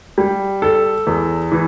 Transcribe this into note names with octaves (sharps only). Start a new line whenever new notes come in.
G3
A4
E2
E3